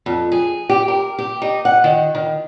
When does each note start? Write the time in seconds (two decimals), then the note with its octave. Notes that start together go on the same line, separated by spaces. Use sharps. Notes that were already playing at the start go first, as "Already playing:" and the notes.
0.06 F2
0.32 G#4
0.69 G4
0.88 A#4
1.18 G4
1.42 D#4
1.65 F#5
1.84 D#3
2.15 D#3